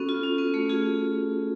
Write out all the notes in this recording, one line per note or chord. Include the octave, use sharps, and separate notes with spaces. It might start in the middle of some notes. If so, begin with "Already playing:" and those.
Already playing: B3 C#4 F#4 A4
F4
C#4
B3
A3
F4 G#4